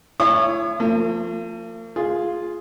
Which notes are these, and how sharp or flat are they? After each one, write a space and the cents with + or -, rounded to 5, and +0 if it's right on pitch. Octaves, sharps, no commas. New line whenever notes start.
E4 +35 C#5 +0 D#6 -35
F3 +0 A#3 -45
F4 +0 G#4 +0